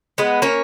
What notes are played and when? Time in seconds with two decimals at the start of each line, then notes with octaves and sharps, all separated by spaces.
0.18 G#3 B3
0.42 A#3 C#4